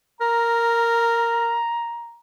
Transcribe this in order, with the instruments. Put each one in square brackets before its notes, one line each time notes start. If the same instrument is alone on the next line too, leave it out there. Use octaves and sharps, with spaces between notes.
[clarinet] A#4 [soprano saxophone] A#5